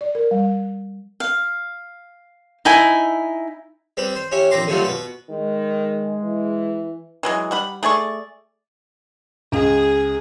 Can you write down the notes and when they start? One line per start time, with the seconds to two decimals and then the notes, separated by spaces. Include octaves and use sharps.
0.01 D5
0.15 A#4
0.31 G3
1.20 F5
2.65 D#4 E4 G#5
3.97 G3 C4 B4
4.15 C5
4.32 C#4 E4 G4
4.51 A#1 C4 G5 A#5 C6 D6
4.68 D3 F#3 G3 A3 C4 F4
4.84 B2 B4
5.30 D#3 G#3
6.23 E3
7.23 E3 F#3 G#3
7.51 G3 F#5 B5
7.83 A3 G#4 D5 C#6
9.52 C#2 G#4